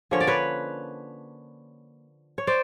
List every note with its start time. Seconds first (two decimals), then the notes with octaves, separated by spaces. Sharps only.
0.11 D3 F3 A#3 C#4 C#5
0.20 D5
0.27 B4 C#5
2.38 C#5
2.47 C5 D5